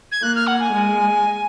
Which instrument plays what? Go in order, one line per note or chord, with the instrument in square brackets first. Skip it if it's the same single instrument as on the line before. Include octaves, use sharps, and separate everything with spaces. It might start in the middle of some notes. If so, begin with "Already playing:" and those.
[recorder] G#6
[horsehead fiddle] A#3 [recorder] F#6
[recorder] F6
F#5
G#5
[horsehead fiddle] G#3